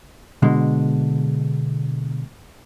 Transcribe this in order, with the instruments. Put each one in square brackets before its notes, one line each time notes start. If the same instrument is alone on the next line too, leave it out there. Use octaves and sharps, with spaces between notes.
[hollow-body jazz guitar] B2 D3 G#3